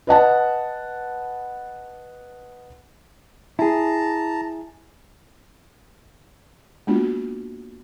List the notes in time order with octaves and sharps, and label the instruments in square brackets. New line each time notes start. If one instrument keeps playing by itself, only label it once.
[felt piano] B4 D#5 F#5 A5
[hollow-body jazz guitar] E4 G#4 [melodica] A5 A#5
[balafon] G#3 A#3 B3 D4 F4 F#4